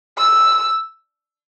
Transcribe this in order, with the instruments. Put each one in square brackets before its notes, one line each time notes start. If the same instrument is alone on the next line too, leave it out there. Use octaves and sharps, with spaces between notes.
[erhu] E6